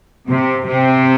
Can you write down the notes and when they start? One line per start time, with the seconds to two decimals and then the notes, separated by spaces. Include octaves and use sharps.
0.28 C3
0.66 C3